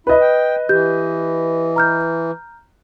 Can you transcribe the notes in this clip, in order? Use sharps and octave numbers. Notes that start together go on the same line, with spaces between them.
E4 B4 D#5
G5
E3 G4 G6
A#5 F6 G6